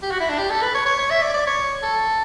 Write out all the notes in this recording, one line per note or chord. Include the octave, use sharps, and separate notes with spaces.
G4
F#4
E4
D4
G4
A4
B4
C#5
C#5
C#5
E5
D5
D5
C#5
A4